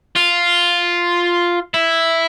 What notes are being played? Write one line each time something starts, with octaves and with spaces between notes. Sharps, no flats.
F4
E4